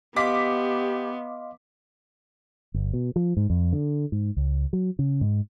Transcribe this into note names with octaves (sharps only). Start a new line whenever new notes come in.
B3 G4 D#5 F5 C6 D6 B6
G1
B2
F3
G#2
F2
D3
G#2
C#2
F#3
C#3
G#2